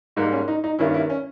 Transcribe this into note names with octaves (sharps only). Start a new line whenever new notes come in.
G#2 G3 A#3 D#4
C#4
D#4
D#4
G2 D#3 A#3 C#4 E4
E4
C#4